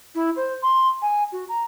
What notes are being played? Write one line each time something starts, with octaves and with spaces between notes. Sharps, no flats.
E4
C5
C6
G#5
F#4
A#5